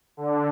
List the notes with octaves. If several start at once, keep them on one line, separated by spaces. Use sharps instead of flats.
D3